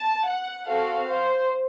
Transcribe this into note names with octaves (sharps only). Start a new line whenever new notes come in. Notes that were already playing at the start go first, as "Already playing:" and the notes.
Already playing: A5
F#5
C4 F#4 A4 F5
C5